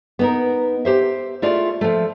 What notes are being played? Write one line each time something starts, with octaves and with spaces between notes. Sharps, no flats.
B3 D#4 A#4
G4 C5 E5
A3 E4 F4 G#4 D5
F3 A3